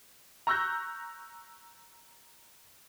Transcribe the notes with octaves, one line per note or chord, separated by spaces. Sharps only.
A#5 C#6 E6 F#6 G6 A#6